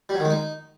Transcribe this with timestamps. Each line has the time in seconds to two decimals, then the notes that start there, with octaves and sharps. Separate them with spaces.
0.09 G3
0.14 F#3
0.20 D#3
0.25 G#3
0.30 D#4